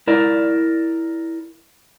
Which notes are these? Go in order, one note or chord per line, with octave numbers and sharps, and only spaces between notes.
E4 A#4 D5